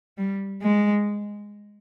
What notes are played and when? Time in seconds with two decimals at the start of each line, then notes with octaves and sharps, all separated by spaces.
0.18 G3
0.63 G#3